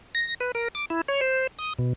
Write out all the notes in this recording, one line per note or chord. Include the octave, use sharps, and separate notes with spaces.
A#6
B4
A#4
D6
E4
C#5
C5
D#6
B2